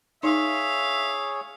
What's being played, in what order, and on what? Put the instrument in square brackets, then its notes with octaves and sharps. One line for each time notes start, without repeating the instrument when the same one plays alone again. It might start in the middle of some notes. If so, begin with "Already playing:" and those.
[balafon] D#4 [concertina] G#4 C#5 [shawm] E5 [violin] F5